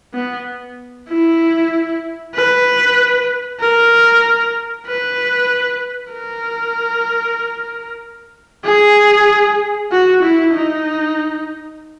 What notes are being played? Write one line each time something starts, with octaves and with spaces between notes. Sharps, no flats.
B3
E4
B4
A#4
B4
A#4
G#4
F#4
E4
D#4